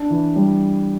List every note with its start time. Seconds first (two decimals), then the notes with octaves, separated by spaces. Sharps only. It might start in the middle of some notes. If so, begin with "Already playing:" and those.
Already playing: D4
0.10 E3
0.36 G3